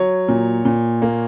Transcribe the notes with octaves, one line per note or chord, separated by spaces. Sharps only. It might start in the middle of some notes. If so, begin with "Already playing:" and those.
Already playing: F#3 C#5
A#2
A#2
A#3